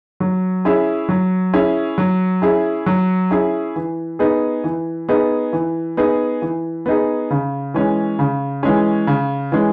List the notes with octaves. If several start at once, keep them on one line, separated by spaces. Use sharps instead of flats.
F#3
C#4 E4 G#4
F#3
C#4 E4 G#4
F#3
C#4 E4 G#4
F#3
C#4 E4 G#4
E3
B3 D#4 G#4
E3
B3 D#4 G#4
E3
B3 D#4 G#4
E3
B3 D#4 G#4
C#3
E3 G#3 C#4
C#3
E3 G#3 C#4
C#3
E3 G#3 C#4